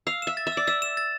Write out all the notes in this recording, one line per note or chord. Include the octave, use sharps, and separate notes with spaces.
F5 E6
E5 E7
A6
E5
D5 E6
E5 E6
E7
A6